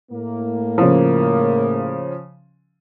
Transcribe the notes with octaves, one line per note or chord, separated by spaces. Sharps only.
A2 A#3
C#3 F3